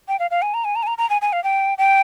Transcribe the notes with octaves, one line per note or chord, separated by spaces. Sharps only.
G5
F5
F5
G#5
A#5
G#5
A#5
G#5
A#5
A#5
G#5
G#5
F5
G5
G5